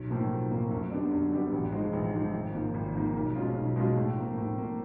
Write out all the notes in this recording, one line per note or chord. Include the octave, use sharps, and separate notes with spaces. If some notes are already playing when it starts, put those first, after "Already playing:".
Already playing: B1
A2 F3 A#3
B1
A2 F3 A#3
F#2
D3 G3 B3 D4
F#2
D3 G3 B3 D4
A1
G#2 F3 G#3
A1
G#2 F3 G#3
G#1
G#2 F3 A#3
G#1
G#2 F3 A#3
B1
B2 G#3 C#4 F4
B1
B2 G#3 C#4 F4
A2
F3 A#3
A2
F3 A#3